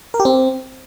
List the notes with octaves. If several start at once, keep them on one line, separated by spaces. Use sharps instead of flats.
A#4
G4
C4